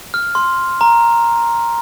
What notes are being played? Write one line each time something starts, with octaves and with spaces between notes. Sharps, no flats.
F6
C6
A#5